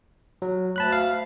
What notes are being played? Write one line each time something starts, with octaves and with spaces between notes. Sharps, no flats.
F#3
D2 A5 B5 F#6
F5